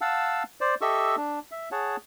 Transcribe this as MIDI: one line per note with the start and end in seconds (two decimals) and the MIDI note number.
0.01 0.43 77
0.01 0.43 78
0.01 0.43 81
0.01 0.43 88
0.61 0.75 72
0.61 0.75 74
0.81 1.16 67
0.81 1.16 69
0.81 1.16 75
0.81 1.16 76
0.81 1.16 85
0.81 1.16 88
1.17 1.39 62
1.51 1.69 76
1.72 1.96 68
1.72 1.96 73
1.72 1.96 78
1.72 1.96 81